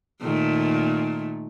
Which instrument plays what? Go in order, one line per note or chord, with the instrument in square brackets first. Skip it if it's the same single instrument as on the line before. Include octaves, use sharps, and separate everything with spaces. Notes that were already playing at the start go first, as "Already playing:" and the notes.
[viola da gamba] A#2 D#3 A3